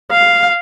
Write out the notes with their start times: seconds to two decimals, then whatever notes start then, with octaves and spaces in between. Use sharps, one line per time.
0.12 F5